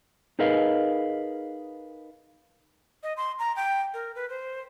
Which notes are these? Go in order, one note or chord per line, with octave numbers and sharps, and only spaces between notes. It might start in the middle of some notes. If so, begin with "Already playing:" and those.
D#4 G#4 A#4 B4 D#5 F5
D#5
C6
A#5
G5
A#4
B4
C5